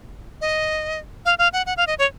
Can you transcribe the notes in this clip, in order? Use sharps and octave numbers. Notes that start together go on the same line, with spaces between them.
D#5
F5
F5
F#5
F#5
F5
D#5
C#5